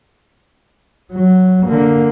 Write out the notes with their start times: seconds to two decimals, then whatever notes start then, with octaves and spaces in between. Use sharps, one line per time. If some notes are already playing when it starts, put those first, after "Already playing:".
1.13 F#3
1.66 D3 A#3